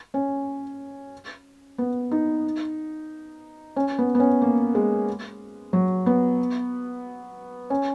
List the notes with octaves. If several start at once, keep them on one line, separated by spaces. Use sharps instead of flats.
C#4
B3
D#4
C#4
B3
B3
C#4
A#3
G#3
F#3
B3
C#4